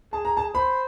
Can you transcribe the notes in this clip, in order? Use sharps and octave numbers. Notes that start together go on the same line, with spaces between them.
G#4 A5
A#5
A5
C5 B5